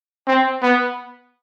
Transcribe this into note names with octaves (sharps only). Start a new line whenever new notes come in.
C4
B3